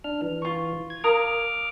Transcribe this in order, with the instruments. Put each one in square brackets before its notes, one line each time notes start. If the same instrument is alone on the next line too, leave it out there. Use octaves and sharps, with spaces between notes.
[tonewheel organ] D4 F6
E3
[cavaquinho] F4 C#6
[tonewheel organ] G#6
[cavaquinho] A#4 F5 D#6 [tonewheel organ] D6 F6